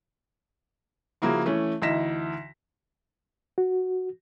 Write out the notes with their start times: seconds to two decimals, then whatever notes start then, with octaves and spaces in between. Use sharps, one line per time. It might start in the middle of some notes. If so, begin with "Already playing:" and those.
1.22 C#3 F3 A#3 E4 F#4
1.46 E3 A3 C#4
1.82 D2 E3 D#4 A#6 B6 E7
3.58 F#4